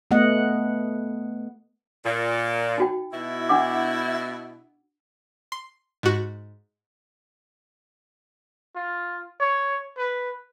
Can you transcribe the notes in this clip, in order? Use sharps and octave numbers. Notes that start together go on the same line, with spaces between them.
A3 B3 D#5 F#5
A#2
D#4 F#4 G5
B2 E4
D4 F#5 D6
C6
G#2 F#4
F4
C#5
B4